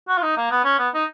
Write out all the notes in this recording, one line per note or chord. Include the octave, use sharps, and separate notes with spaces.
F#4
F4
D#4
A#3
B3
C#4
B3
D#4